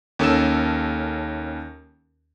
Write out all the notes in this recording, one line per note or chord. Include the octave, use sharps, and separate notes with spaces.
D#2 C#4 A4 A#4 E6 E7